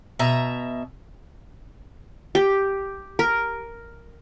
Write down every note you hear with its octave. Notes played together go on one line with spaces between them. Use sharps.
B2 E5 A#5
G4
A#4